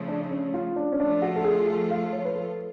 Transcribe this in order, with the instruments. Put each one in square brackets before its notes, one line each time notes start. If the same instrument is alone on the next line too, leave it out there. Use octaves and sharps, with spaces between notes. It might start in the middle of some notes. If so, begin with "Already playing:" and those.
Already playing: [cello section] C#3 F3 A3
[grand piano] D4
D4
C#4
F4
D4
C#4
[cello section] F3 A3 F4 [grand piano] D4
[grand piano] F#4
A4
G#4
A4
F5
C#5
B4
A4